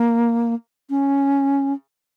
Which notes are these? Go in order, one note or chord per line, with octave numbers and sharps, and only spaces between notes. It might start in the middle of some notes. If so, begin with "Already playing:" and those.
Already playing: A#3
C#4